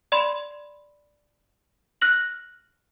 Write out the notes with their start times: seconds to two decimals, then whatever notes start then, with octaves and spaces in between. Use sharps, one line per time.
0.12 D5 B5 C6
2.01 F6 F#6 A#6 F#7